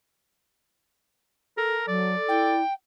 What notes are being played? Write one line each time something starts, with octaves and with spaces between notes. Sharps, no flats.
A4 A#4
F#3 D5
E4 G5